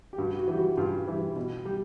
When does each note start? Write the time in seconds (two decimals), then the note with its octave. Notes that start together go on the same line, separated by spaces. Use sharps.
0.13 G4
0.18 G2 F#4
0.39 F#4
0.48 E3 G3
0.58 F#4
0.77 G2 F4
1.07 E3 G3
1.36 B2
1.65 G3